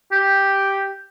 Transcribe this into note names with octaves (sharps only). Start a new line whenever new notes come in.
G4